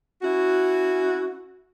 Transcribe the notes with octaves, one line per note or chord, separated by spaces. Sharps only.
C#4 E4 F#4